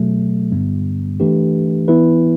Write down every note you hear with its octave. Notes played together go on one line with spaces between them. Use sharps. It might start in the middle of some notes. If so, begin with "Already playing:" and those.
Already playing: B2 F#3 A3
G2 D3 G3 B3
E3 A3 D4 G4 B4
E3 B3 E4 B4